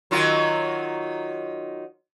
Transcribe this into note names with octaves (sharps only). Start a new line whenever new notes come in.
D#3 F#3 F4